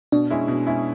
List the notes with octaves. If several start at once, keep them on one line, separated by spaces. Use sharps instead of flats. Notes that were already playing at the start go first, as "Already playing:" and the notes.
B2 D4
G#3 C#4 E4
B2
G#3 C#4 E4